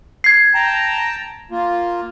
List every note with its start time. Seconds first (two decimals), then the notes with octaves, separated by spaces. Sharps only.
0.24 G#6 C7
0.54 G5 A5 A#5
1.51 A#3 F4